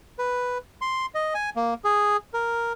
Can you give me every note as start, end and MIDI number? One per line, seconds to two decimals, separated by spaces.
0.19 0.58 71
0.81 1.06 84
1.14 1.34 75
1.34 1.50 80
1.56 1.74 58
1.84 2.17 68
2.34 2.73 70